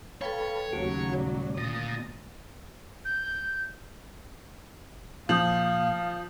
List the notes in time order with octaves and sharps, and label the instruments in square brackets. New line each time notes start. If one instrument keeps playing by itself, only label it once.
[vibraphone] A4 B4 G5 [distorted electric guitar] C#5 [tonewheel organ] F5 A5 B5
[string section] D#2 C#3 F#3 [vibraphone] A3 [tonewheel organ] F#4 G4 F#5
[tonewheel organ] A#2 G3 D5
[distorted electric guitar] A#2 [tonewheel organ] D3 A6 A#6 [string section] D#6
[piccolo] G6
[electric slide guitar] A#2 [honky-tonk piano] F3 [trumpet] F5 [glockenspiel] D#6 G6 F#7